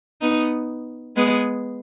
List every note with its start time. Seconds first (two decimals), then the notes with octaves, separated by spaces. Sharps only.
0.21 B3 D#4
1.16 G#3 B3